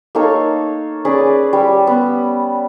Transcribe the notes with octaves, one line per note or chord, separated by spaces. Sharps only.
A#3 D#4 A4 C#5
C#4 G#4 B4 D5
G3
B3